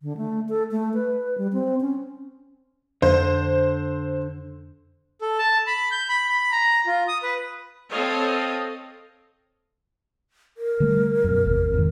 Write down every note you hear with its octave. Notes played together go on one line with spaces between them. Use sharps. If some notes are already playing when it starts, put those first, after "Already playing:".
D3
A3
A4
A3
B4
G3
C4
C#4
F2 D3 C5
A4
A5
B5
G6
B5
B5
A#5
F4
D#6
B4
C4 A4 C#5 D#5 F5
A#4
D3 G3 A3
F#2 B2
G#1 E2 C3
F2 G#2 D#3